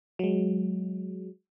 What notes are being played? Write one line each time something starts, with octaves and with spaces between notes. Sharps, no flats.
F#3 G#3